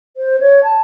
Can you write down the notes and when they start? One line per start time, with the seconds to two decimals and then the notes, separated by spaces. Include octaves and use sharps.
0.17 C5
0.40 C#5
0.64 A5